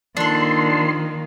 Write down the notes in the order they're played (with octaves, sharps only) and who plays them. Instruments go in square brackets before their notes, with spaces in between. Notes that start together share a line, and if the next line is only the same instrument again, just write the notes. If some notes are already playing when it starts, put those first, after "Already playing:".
[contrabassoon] A#1 [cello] D#3 A#3 [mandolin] D4 A4 [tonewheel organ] C6